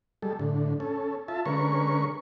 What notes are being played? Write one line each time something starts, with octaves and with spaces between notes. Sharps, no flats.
G3 G#3 A4
A2 D3
C#4 A4
F4 E5 A5
D3 G#3 C#4 A#4 B4 C#6